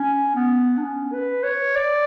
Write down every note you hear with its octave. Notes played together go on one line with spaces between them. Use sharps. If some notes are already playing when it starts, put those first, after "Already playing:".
Already playing: C#4
B3
D4
C#4
B4
C#5
D5